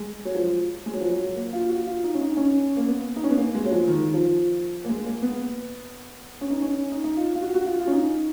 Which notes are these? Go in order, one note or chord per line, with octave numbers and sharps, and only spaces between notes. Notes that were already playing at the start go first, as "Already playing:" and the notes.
Already playing: G#3
F#3
F3
G#3
F#3
F3
F#3
A#3
F4
F#4
F4
D#4
C#4
D#4
C#4
A#3
B3
D#4
C#4
B3
A#3
G#3
F#3
F3
D#3
F3
A#3
G#3
A#3
B3
C#4
D#4
C#4
D#4
D#4
F4
F4
F#4
F#4
F4
F4
C#4
D#4